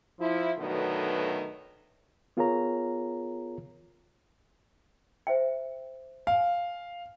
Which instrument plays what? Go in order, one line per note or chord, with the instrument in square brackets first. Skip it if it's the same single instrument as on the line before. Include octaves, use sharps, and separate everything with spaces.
[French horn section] F3 E4
B2 D3 D#3 F#3 A3 B3
[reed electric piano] B3 F4 G#4 A#4 C#5 A#5
[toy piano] C5 E5 G5
[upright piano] F5 [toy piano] G#5